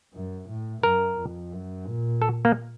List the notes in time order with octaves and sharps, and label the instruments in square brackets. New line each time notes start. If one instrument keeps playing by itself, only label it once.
[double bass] F#2
A2
[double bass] F#2 [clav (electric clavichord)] A#4
[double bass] F2
F#2
A#2
[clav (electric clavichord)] A4
A#3